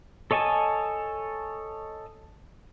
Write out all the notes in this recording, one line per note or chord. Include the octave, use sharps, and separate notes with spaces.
A4 C#5 D#5 G#5 A5